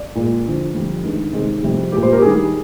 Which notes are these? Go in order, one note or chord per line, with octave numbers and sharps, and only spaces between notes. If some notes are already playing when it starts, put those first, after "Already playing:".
Already playing: D5
A#2 G#3
G2 D3 F3
F2 D3 G3
G2 D#3 G#3
C3 D#3 G#3
F2 C3 G3
A#2 G#3 G4
C5
A#4
G4
G2 D#3 G3 G#4